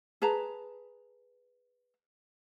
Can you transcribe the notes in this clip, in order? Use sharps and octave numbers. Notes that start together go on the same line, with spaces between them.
G#4 B4 A5 A#5